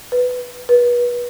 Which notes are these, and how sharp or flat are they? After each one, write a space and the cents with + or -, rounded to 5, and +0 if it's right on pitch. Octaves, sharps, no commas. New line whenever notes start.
B4 +10
B4 -30